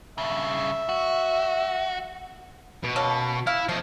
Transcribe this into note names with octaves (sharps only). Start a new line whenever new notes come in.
G2 C#3 E5
F#4
B2
A#3 C#4 A4
E4 F5
F3 A3 D#5